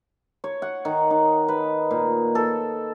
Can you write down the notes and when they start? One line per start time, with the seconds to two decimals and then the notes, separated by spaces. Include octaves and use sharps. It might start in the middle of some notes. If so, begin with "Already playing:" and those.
0.44 C#5
0.62 F#5
0.85 D#3
1.11 D#4
1.48 B4
1.91 A#2
2.35 A4